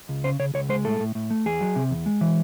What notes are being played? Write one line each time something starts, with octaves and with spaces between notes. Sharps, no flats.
C#2
C#3 C5
C#3 C#5
C#2 C#5
G#3 C5
A2 A4
A2
A2
A3
E2 G#4
F#3
C3
E2
G#3
E3